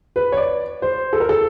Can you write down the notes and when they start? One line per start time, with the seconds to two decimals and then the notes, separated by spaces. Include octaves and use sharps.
0.16 B4
0.32 C#5
0.37 D5
0.82 C5
1.13 A4
1.20 A#4
1.29 A4